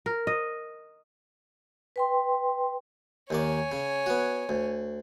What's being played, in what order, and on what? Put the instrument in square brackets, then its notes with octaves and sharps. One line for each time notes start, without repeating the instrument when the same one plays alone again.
[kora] A#4
D#5
[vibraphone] B4 G5 C6
[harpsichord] D#2 D#3 D5 [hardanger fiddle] C#5 G#5
[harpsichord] C#3
B3 F#4
D2